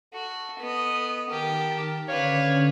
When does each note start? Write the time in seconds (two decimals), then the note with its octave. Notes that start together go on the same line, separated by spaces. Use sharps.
0.14 F#4 A4
0.59 B3 D#5
1.30 D#3 G4 A#4 A5
2.09 D3 C#4 B4 C#5 D5 F5